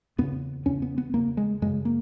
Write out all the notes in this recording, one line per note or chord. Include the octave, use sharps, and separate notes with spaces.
E2 C#3 B3
E2 C#3 C#4
B3
B3
E2 C#3 A#3
G#3
F#2 C#3 G#3
A#3